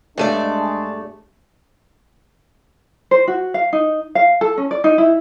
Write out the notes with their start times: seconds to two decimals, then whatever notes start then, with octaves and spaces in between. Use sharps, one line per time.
0.18 G2 G#3 A3 D4 D5
3.11 C5
3.28 F#4
3.54 F5
3.73 D#4
4.15 F5
4.41 A4
4.58 C#4
4.71 D5
4.84 D#4
4.98 E4